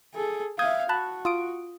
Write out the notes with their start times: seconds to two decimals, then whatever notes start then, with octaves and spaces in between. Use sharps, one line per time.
0.14 G#4 A4
0.59 E5 F5 D#6 G6 G#6
0.89 F#4 A5 B5 F#6
1.25 F4 D#6 D7